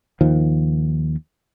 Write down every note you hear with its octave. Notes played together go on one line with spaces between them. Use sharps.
D#2 D#3 F3